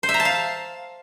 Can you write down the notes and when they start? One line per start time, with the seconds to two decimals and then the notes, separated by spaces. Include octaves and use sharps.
0.03 C5
0.09 E5
0.14 A#5
0.20 A5
0.25 F5